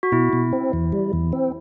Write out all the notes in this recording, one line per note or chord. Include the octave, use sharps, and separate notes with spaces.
F#4
B2 E4
B2
C4
E2
G3
E2
C4